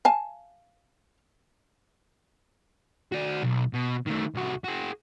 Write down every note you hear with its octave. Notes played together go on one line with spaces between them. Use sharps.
F5 G#5 A5
F#4 D5
B1
B2
D#3 A3
C2 F#4
F#4 G#4